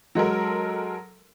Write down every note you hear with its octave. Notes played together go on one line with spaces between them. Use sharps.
F#3 G#3 A4 A#4